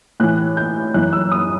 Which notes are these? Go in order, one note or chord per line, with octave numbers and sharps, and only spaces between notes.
A2 E3 F#6
G6
F#2 E3 F#6
E6
D#6